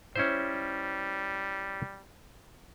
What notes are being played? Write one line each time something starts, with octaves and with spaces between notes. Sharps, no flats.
G3 C#4 E4 C5